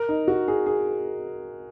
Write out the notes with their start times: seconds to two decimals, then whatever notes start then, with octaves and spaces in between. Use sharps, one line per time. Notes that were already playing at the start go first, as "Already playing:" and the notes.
Already playing: A#4
0.08 D#4
0.28 F#4
0.48 G#4
0.66 G#4